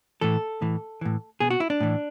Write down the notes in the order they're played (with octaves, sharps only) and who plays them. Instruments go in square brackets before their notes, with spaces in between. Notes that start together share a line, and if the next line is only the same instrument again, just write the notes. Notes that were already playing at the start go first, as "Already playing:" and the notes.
[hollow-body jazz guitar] A2 E3 A4
A2 E3
A2 E3
B2 G#4
F#4
E4
D4
A2 E3